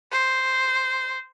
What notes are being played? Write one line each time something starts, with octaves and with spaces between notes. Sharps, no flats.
C5